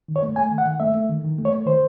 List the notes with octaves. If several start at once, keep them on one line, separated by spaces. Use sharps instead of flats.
D#3
C#5
A3
A3 G#5
D#3
F#5
D#3
A3 E5
A3
D#3
D#3
A3
C#5
A3
D#3 C5